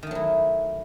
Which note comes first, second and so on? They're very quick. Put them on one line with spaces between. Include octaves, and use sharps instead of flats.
D#3 A3 F#3 E4